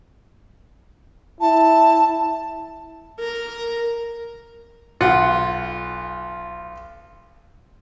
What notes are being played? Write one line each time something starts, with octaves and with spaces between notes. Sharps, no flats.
E4 A5
A#4
B1 F4 F#5